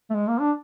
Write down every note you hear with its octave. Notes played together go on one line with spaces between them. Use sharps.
A3
G#3
A#3
D4